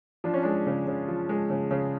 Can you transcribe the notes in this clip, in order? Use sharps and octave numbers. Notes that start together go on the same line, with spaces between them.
F3 D4
C#4
G#3 D4
C#3
C#3
F3
G#3
C#3
C#3